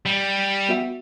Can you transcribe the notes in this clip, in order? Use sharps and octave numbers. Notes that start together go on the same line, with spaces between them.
G3
B3 F#4 E5